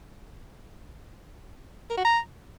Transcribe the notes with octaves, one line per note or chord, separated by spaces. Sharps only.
A#4
F#4
A#5